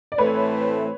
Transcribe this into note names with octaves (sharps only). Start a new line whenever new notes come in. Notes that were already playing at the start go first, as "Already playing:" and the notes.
D5
A2 E3 A3 C4 E4 B4 C#5